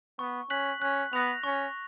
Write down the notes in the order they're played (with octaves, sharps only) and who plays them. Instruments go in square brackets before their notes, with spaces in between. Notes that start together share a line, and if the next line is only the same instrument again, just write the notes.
[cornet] B3 [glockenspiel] C#6
[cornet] C#4 [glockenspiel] F#6 B6 F#7
[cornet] C#4 [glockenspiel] F#6
[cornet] B3 [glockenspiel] A#6 F7
[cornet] C#4 [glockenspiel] C#6